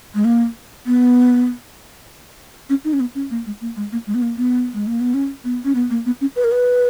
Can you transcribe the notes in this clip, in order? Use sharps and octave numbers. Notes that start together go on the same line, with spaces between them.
G#3
A#3
B3
C#4
D#4
C#4
B3
C#4
A#3
G#3
A#3
G#3
A#3
G#3
B3
A#3
B3
G#3
A#3
B3
C#4
B3
C#4
B3
A#3
B3
C#4
B4
A#4
B4